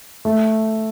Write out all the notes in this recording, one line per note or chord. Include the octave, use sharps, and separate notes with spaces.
A3